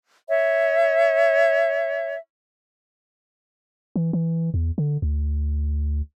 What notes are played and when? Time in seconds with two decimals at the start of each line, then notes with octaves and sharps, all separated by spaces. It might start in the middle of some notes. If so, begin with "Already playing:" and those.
0.28 C#5 E5
3.96 E3
4.13 E3
4.54 E2
4.78 D3
5.02 D2